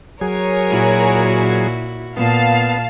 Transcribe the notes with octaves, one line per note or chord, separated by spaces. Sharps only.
F#3 G#4 A#4 C#5 G#5
A#2 E4 F#4
A#2 B3 F5 A5